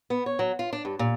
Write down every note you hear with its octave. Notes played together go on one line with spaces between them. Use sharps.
B3
C#5
F#3
F4
D4
G2
A#2